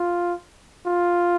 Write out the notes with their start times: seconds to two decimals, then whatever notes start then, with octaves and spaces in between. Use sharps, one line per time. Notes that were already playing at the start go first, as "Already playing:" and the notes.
Already playing: F4
0.86 F4